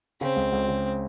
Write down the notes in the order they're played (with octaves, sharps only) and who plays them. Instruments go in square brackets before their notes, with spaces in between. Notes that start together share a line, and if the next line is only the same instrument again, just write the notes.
[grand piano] C#3 [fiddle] C4
[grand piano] C#2
C#2
C#3